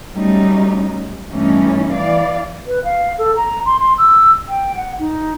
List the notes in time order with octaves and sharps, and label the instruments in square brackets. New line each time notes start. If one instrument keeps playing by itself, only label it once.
[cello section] F#3 G3 A3 C#4 D#4
G2 E3 A3 B3 C#4 D#4
E3 D5 F5
[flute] B4
F5
A4
A#5
C6
C6
E6
G5
F#5
D#4